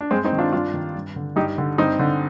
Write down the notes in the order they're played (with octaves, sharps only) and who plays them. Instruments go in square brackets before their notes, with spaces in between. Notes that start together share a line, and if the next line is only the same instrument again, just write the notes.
[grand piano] D4
G2 G#3 C4
C4 D#4
D#3
D4 F4
G2 D4 F4
D#3
G2
D3
G2 D#4 G4
D3
G2 C4 D#4
D3